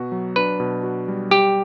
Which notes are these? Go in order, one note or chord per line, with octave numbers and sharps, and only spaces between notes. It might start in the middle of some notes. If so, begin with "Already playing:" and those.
Already playing: B2 B3 F#4
F#3
D4 B4
B2
F#4
G3
G3 G4